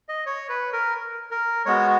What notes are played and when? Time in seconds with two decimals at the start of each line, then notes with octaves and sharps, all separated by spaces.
0.09 D#5
0.26 C#5
0.49 B4
0.73 A#4
1.31 A#4
1.66 G#3 B3 F#4 C#5